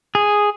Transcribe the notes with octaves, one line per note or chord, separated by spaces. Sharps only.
G#4